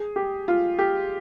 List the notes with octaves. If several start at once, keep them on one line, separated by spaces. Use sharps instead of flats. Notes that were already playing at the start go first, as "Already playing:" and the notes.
Already playing: G#4
G4
F4
G4